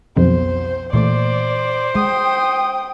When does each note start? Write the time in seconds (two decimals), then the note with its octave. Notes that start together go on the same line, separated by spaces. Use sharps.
0.17 B1 F2 B2 C5
0.93 A#2 E3 A3 C5 D5
1.95 G#3 G5 D#6